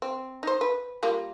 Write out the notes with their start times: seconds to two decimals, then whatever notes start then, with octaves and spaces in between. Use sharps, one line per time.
0.02 C4
0.43 D#4 C5
0.61 B4
1.03 G3 A#3 F4